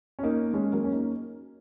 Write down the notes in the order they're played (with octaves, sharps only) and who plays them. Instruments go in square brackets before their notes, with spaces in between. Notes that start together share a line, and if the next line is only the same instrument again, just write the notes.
[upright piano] C#4
A#3 D#4
G#3 C#4
F#3 A#3
C#4
A#3 D#4